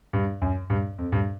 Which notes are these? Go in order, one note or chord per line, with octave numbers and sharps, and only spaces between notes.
G2
F#2
G2
F2
G2